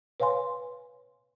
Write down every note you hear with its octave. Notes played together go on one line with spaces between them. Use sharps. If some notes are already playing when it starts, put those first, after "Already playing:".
B4 C#5 F5 G#5 C6